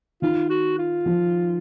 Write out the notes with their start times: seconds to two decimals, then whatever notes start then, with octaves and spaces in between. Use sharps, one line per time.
0.22 D#3 F4
0.50 F#4
0.78 F4
1.06 F3